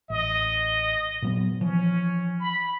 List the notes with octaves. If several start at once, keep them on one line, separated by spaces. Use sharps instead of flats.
A1 D#5
A#2 F#3 B3
E3 F3 C#4
B5